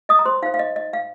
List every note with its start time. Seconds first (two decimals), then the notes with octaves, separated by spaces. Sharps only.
0.09 D#5 D#6
0.19 A#5
0.26 C5 C6
0.42 D#4 F5
0.46 C5
0.54 F5
0.59 D#5
0.76 D#5
0.93 F5